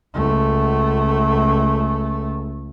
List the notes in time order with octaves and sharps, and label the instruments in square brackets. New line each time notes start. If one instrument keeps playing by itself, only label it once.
[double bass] C#2 A3